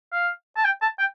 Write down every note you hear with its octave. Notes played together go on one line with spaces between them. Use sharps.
F5
A5
G5
A5
G5